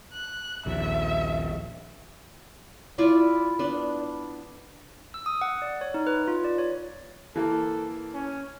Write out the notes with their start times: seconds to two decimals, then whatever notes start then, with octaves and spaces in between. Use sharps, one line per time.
0.13 F#6
0.66 A#1 D#2 E5
2.98 E4 F4 D5 D6
3.59 B3 D4
5.14 E6
5.26 D#6
5.41 F#5
5.62 D5
5.81 C#5
5.94 D#4
6.07 B4
6.28 F4
6.44 D5
6.59 C#5
7.36 E3 A#3 A4
8.14 C#4